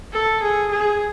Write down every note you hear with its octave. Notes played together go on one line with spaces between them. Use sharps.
A4
G#4
G#4